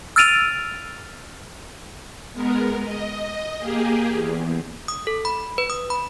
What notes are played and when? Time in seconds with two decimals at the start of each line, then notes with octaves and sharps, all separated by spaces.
0.16 E6 F6 A6 D7 D#7 F7
2.33 G#3 B3 A#4
2.83 D#5
3.59 A#3 G4 G#4
4.11 E2
4.88 D#6
5.07 A4
5.25 B5
5.58 B4
5.70 D#6
5.90 B5